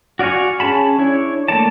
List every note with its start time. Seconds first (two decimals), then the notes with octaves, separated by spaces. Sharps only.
0.19 F#4 D5 F5 G#5 C#6
0.60 C#4 G#4 A5 B5
0.98 D4 E4 C#5
1.48 A3 A#3 C#5 D5 A5